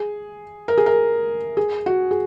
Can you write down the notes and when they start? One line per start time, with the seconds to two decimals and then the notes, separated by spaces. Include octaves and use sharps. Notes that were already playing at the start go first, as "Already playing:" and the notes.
Already playing: G#4
0.68 A#4
0.78 G#4
0.86 A#4
1.57 G#4
1.86 F#4
2.11 G#4